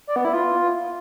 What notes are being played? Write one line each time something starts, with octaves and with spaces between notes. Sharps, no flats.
D5
B3
E4
F4